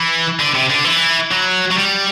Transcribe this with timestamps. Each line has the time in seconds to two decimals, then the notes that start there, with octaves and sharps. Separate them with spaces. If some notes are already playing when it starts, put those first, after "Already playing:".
Already playing: E3
0.40 D3
0.55 C3
0.71 D3
0.85 E3
1.31 F#3
1.71 F#3
1.76 G3